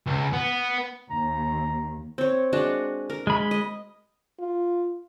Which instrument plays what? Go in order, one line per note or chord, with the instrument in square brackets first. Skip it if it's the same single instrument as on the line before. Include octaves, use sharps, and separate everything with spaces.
[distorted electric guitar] C#2
B3
[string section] D#2 [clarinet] A#5
[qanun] C4 C#5
G#3 D4 F#4
A#4
[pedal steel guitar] G#3 B5
[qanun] D#5
[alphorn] F4